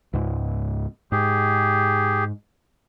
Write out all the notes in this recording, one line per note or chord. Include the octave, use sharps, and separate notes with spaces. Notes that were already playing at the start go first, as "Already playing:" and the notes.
C#2 G#2
G#2 G4 G#4